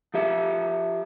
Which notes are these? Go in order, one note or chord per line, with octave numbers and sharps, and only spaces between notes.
F3 G4 E5